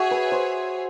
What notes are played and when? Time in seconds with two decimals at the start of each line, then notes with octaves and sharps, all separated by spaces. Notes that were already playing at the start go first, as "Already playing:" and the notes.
Already playing: F#4 G#4 C#5 E5
0.11 B4
0.32 C5